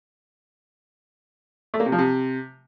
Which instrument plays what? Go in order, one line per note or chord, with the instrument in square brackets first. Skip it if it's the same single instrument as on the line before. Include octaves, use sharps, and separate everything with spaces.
[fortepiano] A3
A#3
C3
F3
C3